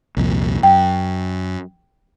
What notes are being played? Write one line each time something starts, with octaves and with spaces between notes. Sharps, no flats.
C2 F2 A#2
F#2 G5